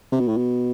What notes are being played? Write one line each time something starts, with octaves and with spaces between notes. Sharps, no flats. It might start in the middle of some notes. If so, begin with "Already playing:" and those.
C3
B2
A2
B2